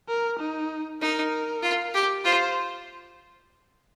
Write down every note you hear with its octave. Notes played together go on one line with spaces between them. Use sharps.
A#4
D#4
D#4 A#4
F4
G4
F4 C5